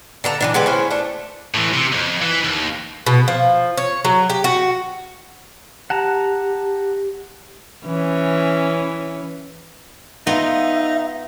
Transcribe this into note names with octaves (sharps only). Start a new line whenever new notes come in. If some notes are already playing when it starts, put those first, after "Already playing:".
D3 A5 A#5
E3 F#3 D4
D3 G#3 G4 B4
C#4 E4 C5
A3 D4
A2 E3
C3
C2 F2
E3
D#2
B2
F3
C#5
F#3
G4
F#4
G4 F#5 A5 A#5
E3 C#4
B3 D#4 F4 E5